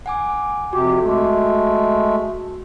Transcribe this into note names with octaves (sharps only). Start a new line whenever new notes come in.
F#5 G#5 D6
F2 C3 F#4 G4
G#3 A3